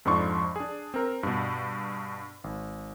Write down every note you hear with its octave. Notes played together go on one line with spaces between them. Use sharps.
F2 G#2 F3 D4 C6 C#6
D4 G#4
C4 A#4
G2 B2
G#1